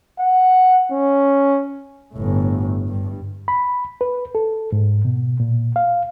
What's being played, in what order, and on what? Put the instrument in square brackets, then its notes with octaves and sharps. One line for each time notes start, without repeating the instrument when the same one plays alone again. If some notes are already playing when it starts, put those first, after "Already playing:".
[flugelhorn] F#5
C#4
[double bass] G1 A2
G2
[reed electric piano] B5
B4
A4
G#2
B2
A#2
F5